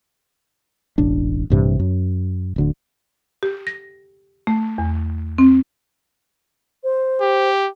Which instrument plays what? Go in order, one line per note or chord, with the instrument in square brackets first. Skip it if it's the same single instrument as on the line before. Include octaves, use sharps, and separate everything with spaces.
[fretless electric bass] E1 A1 D4
A#1 G2 C3 E3
F#2
D1 D2 D3
[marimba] G4
A#6
A3
E2
C4
[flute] C5
[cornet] G4